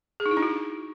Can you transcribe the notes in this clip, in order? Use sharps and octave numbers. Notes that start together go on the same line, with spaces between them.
G#4
D#4
E4
D4
F#4